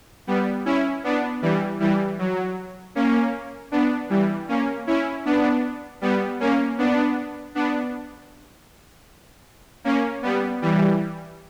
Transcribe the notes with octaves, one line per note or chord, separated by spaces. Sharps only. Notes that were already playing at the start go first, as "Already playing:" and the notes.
G3 B3
C#4 E4
B3 D4
E3 G3
E3 G3
F#3
A#3 C#4
B3 D4
E3 G3
A#3 C#4
C#4 E4
B3 D4
G3 B3
A#3 C#4
B3 D4
B3 D4
A#3 C#4
G3 B3
E3 G3